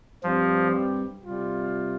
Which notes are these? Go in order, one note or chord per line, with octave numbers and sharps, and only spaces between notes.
G2 F3 G3 C4 G4
C3 G3 F4